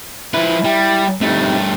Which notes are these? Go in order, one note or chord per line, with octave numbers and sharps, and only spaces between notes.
F3 E4 B4
G3 E4
G2 A3 C4 D#4 G4